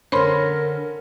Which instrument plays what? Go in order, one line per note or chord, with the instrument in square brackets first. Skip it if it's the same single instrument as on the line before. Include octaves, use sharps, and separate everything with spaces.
[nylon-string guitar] D3 D4 [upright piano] C#4 [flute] A#4 [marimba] C5 B5 C6